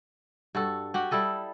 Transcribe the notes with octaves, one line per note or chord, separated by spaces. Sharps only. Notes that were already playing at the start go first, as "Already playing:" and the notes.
G2 F#4 A4
F#4 G4 F#5
G3 E4 A4 D#5